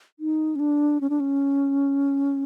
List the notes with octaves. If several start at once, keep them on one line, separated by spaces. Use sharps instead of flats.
D#4
C#4
D4
C#4
D4
C#4